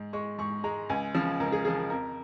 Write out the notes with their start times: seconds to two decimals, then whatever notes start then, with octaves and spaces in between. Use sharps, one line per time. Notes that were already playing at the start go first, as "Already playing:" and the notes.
Already playing: G#2
0.13 G#3 C#6
0.38 G#2 C#6
0.64 G#3 A#5
0.89 C#2 G#5
1.14 C#3 F3
1.40 C#2 A#4
1.52 G#4
1.65 C#3 F3 G#4
1.78 A#4
1.90 F2 A#4